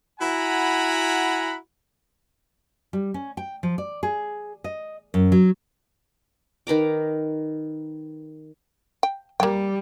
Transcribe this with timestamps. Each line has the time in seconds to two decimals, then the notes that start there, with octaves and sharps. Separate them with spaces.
0.20 E4 F#4 F#5 G#5 A#5 B5
2.93 G3
3.14 C#4
3.37 G5
3.63 F3
3.78 D5
4.03 G#4
4.64 D#5
5.14 F#2
5.32 F#3
6.67 D#3 B4 A#5 D6
9.03 G5
9.40 G3 A#3 G5